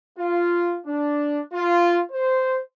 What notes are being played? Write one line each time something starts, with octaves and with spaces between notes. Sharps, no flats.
F4
D4
F4
C5